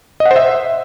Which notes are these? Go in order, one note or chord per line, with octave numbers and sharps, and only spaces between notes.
D#5
F#5
C5
E5